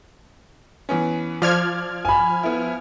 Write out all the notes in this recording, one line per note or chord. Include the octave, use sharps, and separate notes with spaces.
E3 B3 C#4
F3 D5 F6 G#6
G#5 B5
B3 E4